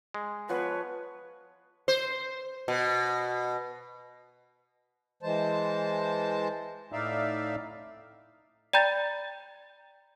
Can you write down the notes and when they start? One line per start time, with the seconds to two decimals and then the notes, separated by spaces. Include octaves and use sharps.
0.14 G#3
0.49 F3 B3 B4 C#5
1.88 C5
2.68 B2
5.23 E3 G#3 C5 A5
6.92 A2 D#4 D5 E5 F5
8.73 D5 G5 A#5 B5 G6 A6